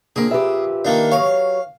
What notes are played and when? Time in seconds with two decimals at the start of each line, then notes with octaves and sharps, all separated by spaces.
0.16 A#2 D3 F3 A#3 C4 G#4
0.31 G4 B4 E5
0.85 D#3 A#3 D4
1.12 F#3 C#5 F5